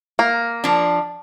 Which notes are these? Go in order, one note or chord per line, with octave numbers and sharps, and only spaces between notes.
A#3
F3 D4